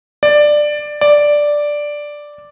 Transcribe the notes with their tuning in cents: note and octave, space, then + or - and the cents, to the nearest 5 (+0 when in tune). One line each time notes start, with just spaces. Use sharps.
D5 +10
D5 +0